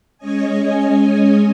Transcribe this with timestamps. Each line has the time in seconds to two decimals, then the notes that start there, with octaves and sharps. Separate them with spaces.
0.18 G#3 C#4 C#5 D#5 G#5